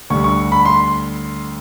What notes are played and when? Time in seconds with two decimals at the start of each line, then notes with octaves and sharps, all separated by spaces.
0.10 D2 D3 G3 C#6
0.24 C#6
0.52 B5
0.65 C6